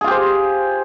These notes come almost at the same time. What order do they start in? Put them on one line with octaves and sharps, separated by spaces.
G#4 F4 G4 C5